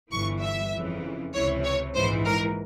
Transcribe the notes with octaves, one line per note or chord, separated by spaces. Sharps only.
G1 G2 E3 C#6
E5
F2 C#3 E3
C#2 C3 E3 C#5
C#5
A#1 G#2 E3 C5
A#4